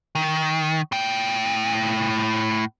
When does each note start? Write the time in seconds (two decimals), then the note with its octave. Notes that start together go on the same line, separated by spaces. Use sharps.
0.15 D#3
0.92 A2 G5